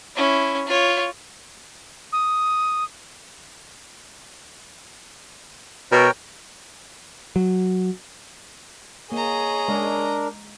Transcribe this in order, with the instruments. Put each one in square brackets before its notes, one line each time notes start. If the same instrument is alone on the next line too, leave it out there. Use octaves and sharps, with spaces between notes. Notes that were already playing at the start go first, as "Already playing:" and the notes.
[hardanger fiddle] C#4 E4
F4 C#5
[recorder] D#6
[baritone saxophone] B2 [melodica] A#4 C#5 G5
[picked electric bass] F#3
[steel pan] A#3 [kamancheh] G#4 C#5 [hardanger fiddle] D#5 A#5
[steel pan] G#3 [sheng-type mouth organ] D4 A#4